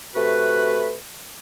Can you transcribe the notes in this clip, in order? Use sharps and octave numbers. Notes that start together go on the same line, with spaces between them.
C3 A3 F#4 B4